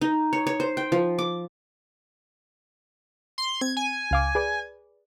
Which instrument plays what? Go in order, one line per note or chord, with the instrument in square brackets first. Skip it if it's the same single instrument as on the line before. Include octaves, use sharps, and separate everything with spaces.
[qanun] D#4
C#5
C#5
C5
G5
F3
D6
[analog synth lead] C6
[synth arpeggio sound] C4 [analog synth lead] G#6
[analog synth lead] G#5
[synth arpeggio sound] C#2 F5 D6
G#4 B4 D5